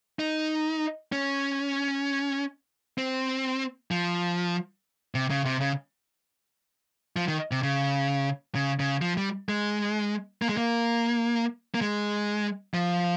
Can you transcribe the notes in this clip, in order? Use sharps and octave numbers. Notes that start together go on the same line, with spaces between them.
D#4
C#4
C4
F3
C3
C#3
C3
C#3
F3
D#3
C3
C#3
C#3
C#3
F3
G3
G#3
A#3
G#3
A#3
A#3
G#3
F3